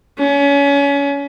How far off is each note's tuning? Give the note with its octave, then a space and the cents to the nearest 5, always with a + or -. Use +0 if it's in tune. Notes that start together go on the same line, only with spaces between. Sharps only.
C#4 +30